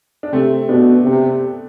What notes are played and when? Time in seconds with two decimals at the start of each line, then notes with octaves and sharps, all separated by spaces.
0.23 D4
0.33 C3 A3 C4
0.69 B2 B3 D4
1.05 C3